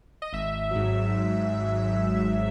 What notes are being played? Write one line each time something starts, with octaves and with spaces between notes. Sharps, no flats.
D#5
G#1 E5
G#2 F#3
G#1